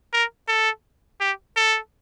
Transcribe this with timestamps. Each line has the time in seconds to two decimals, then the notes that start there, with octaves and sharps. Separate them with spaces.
0.13 A#4
0.48 A4
1.20 G4
1.56 A4